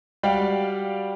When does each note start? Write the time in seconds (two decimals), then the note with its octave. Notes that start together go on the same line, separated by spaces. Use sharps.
0.23 G3 F#4 D5 F5 G5